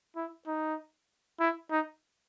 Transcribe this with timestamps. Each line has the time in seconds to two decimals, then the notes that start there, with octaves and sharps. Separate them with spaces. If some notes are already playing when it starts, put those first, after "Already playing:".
0.16 E4
0.47 D#4
1.40 E4
1.71 D#4